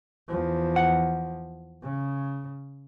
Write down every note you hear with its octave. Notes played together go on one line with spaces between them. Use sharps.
E2 F3
F#5
C#3